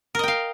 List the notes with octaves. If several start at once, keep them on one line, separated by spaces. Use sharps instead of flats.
A#4 D#5 F5 G5